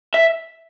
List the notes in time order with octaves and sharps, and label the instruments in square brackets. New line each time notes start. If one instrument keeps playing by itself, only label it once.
[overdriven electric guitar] E5